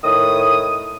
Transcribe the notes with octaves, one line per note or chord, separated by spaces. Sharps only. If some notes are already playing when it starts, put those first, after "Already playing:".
A2 D#3 D#6